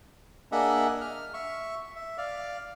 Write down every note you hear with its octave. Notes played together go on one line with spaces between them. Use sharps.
A#3 D4 G#4 D#5 E5 F#5
F6
E5 C#6
E5
D5 F5